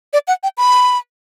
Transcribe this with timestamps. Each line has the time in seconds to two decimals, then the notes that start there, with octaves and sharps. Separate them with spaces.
0.13 D5
0.28 F#5
0.43 G5
0.58 B5